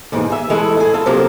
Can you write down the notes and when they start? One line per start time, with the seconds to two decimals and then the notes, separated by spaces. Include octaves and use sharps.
0.12 D#2 G#2 B2 E3
0.30 G#4 E5
0.49 E3 G#3 A3 E4
0.77 E4 G#4
0.94 F4 A4
1.06 C3 F3 F#3 A#3 F4 E5